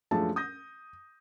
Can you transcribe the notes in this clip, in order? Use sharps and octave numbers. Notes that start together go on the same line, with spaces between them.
F#2 F3 G#3 A3 D4 A5
D#6 G6 A#6